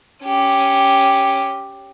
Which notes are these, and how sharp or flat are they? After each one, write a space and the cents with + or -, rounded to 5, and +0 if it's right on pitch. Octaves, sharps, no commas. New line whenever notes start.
C#4 +0 G4 +0